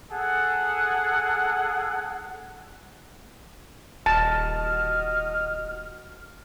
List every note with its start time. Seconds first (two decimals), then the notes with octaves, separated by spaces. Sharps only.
0.12 G#4 A4 F#5
4.06 D#1 F#4 D#5 A5 F6